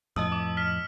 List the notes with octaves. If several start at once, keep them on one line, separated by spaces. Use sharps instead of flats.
F2 A2 D#5 A5 D#6 E6
D6
F6 B6